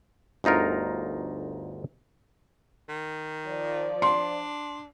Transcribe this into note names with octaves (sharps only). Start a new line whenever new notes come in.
G1 D2 D#4 F4 A#4
D#3
F3 D5
D4 C6